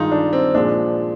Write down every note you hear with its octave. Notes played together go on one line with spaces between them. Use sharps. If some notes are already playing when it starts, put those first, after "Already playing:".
Already playing: G2 D#3 G#3 D#4 F4
D4
C4
A#2 F3 G#3 D4